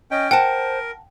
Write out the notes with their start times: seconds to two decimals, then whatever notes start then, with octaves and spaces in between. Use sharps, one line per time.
0.11 C#4 D#5 G5
0.31 A#4 C5 F#5 G5 A5